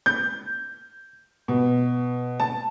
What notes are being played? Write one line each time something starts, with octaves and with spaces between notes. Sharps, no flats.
G6
B2
A5